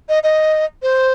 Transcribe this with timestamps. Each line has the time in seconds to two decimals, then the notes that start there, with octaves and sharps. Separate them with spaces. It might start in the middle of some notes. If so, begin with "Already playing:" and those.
0.09 D#5
0.23 D#5
0.82 C5